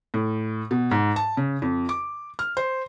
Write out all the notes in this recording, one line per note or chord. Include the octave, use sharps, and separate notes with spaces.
A2
B2
G#2
A5
C#3
F2
D6
F6
C5